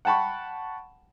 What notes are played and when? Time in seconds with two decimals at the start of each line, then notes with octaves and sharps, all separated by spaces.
0.05 F#5 G5 A5 B5 C#6